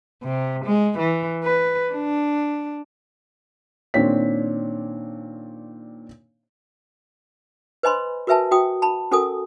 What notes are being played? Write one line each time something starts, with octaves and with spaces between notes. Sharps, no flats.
C3
G#3
E3
B4
D4
A#2 D#3 C4 D4 C#5 B6
B4 C5 D#5 G#5 B5 C6
F#4 A#4 B4 E5 G#5 A5
F#4 G5 D#6
A5 B5
C#4 F#4 A4 A#4 G#5 D#6